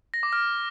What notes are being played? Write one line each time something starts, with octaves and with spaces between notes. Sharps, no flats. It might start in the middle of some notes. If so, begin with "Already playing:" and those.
A#6
D6
F6